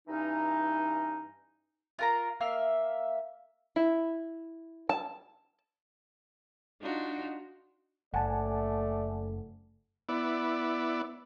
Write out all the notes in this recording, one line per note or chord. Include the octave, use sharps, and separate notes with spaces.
G2 E3 C#4 D#4
F4 A#4 A#5
A#3 E5 F5
E4
A5
D4 D#4 F4 F#4
F#1 A3 D5 F#5 G#5 A5
B3 E4 D5